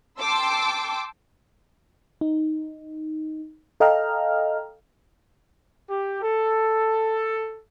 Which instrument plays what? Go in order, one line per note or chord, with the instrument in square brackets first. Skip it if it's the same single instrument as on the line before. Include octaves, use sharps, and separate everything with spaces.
[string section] G5 A5 C6 D6 E6
[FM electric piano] D#4
A4 D#5 F5 G5 A#5 F6
[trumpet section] G4
A4